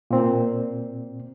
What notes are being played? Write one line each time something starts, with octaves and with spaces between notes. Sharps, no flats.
A#2 C4